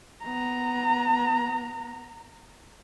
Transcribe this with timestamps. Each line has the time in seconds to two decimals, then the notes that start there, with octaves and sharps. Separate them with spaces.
0.23 B3 A#5